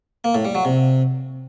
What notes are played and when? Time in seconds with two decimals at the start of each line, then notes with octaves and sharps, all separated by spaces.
0.24 A#3
0.35 A2
0.45 G3
0.55 F#3
0.65 C3